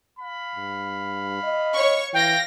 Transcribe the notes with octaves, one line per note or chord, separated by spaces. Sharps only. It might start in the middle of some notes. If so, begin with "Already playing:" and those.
F5 B5
G2
D#5
C#5 C#6
E3 F5 G5 A#6